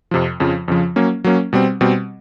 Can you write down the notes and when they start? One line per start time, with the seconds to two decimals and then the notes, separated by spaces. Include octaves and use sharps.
0.11 F2 C3 F3
0.40 F2 C#3 F3
0.68 F2 C#3 F3
0.96 F#3 A#3 C#4
1.24 F#3 A#3 C#4
1.53 B2 G3 C4
1.81 B2 G3 C4